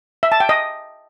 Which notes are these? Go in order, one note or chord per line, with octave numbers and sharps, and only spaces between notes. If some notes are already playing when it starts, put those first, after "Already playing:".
E5
A5
G5
D#5